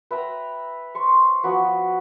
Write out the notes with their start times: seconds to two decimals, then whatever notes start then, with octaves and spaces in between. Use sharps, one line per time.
0.11 B4 E5 G5 A#5
0.95 C5 C6 C#6
1.43 F3 B3 F#4 B4